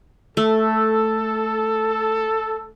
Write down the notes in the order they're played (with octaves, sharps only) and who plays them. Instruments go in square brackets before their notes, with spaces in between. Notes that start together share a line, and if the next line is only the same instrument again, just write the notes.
[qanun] A3 [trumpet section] A4